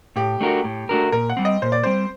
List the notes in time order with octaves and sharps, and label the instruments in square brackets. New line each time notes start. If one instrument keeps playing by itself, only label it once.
[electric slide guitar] A2 [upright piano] G4
[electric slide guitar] A3 D4 F#4 A#4
A2
A3 D4 F#4 A#4
[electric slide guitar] A#2 [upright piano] A#4
[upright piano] F#5
[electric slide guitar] G3 C4
[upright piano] D#5
[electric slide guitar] A#2 [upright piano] C5
[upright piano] D5
[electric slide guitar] G3 C4 [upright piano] C5